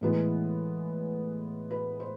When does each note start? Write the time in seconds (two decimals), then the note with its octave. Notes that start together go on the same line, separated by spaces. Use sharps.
0.01 A2 E3 G#3 B3
1.71 B4
2.00 C5